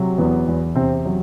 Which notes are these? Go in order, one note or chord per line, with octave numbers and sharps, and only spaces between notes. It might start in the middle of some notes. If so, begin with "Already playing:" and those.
Already playing: C3 F#3
E2 B3
E2
C3 C4
F#3